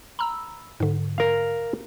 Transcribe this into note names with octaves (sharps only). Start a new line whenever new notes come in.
A#5 B5 E6
G#2 D3
A#4 F5